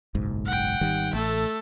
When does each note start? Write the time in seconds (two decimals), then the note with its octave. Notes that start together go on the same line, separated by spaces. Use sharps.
0.15 F#1 B1 G#2
0.46 F#5 G5
0.81 G#1 D#3 G3
1.13 A1 A3 A4